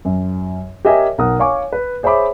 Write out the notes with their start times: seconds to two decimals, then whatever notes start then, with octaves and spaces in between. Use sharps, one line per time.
0.05 F#2
0.85 G4 A#4 C#5 D#5 E5 G#5
1.18 B1 A#4 F#5 D#6
1.39 C#5 F5 G#5 C#6 D6
1.73 B4
2.03 G#4 C5 C#5 E5 B5 D6